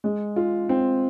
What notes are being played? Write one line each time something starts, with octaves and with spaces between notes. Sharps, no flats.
G#3
F4
C4